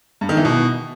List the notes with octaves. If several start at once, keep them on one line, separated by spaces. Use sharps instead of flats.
G2
D#3
E3
B2